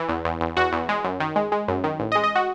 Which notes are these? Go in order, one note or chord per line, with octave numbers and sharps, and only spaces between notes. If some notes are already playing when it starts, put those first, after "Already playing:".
Already playing: E3
E2
E2
E2
E2 F#4
E2
G#3
F#2
D#3
G#3
G#3
F#2
D#3
A1
D#5
G#3
D#5
F#4